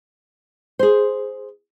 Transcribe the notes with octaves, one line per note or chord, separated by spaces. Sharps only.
G#4 C5